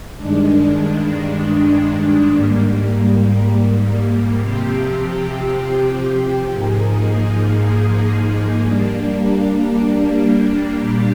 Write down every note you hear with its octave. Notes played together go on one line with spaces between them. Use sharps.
G2 D#3 G#3 D4
G#2 G3 A#3
C3 F3 C4 G4
G#2 F3 A#3 D#4 G#4
G3 A#3 D4
A#2 G3 A#3 D4 G4